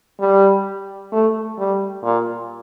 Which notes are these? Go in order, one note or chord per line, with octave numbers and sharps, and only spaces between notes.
G3
A3
G3
A#2